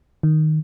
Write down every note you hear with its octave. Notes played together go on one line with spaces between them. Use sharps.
D#3